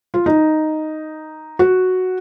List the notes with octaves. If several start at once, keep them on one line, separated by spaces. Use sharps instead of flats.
F4
D#4
F#4